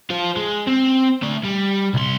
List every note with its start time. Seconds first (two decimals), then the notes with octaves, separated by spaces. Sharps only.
0.10 F4 C5
0.36 G#3
0.67 C4
1.23 A3 D5
1.44 G3
1.94 C2 C6